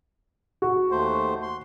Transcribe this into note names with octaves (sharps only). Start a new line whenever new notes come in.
F#4
D#2 A3 C5
C6